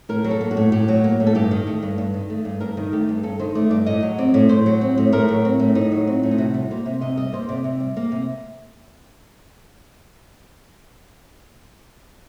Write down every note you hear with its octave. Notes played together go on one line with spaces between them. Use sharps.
A2 A#4
F#3
A4
A#3
F#4
A2
A2 G4
F#3
A#3
A2
A4
G2 G4
D#3
A3
G2
G2
D#3
A3
G2
G2 A#4
D#3
A3 G4
G2
G2 A4
D#3 C5
A3 D5
G2 D5
A2 D#5
F#3
C4 D5
A2
A2 C5
F#3
C4
A2
A2 A#4
F#3
C4
A2
A2 D#4
F#3
C4
A2
D#4
C3 F#4
G3
A#3 C5
C3
C3 D#5
G3 D#5
A#3 C5
C3 D5
C3
G3
A#3
C3